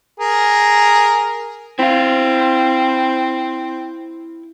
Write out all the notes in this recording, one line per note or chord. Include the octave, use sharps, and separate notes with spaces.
G#4 A#4
C4 E4 F5